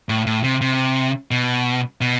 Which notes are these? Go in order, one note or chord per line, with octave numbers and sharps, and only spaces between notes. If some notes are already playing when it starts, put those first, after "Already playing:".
A2
A2
C3
C3
B2
B2